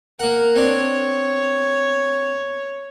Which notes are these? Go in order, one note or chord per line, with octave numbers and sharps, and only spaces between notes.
A#3 A#4 F#5
C4 D4 C#5